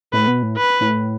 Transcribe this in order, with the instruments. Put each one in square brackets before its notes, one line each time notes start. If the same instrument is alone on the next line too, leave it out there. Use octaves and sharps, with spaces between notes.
[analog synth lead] A2 [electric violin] B4
[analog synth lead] B2
A2
[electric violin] B4
[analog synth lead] A2